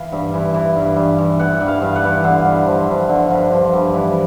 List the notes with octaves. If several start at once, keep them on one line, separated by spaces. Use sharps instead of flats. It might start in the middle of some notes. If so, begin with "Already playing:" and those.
Already playing: E3 F5
G2
E3
E3
G2
G2
E3
E3 F#5
G2
F5
G2
F#5
E3
D3 F5
G2
F3
G2
D3
G2
F3
G2
E3